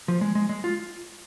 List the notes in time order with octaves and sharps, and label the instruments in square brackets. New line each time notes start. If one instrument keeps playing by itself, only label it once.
[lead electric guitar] F3
G#3
G#3
G#3
F4